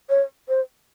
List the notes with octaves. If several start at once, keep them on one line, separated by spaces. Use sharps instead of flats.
C#5
C5